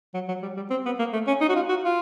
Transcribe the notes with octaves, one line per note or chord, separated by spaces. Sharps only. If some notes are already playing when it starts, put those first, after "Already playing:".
F#3
F#3
G3
G3
C4
B3
A#3
A3
C#4
D#4
F#4
F4
F#4
F4